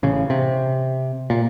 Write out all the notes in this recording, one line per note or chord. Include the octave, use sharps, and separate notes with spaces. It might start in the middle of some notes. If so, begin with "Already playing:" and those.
A1 C#3
C3
A#2